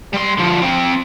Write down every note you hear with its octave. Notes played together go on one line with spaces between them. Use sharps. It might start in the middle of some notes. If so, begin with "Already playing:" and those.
G3 C6
D3 F3
C4 F4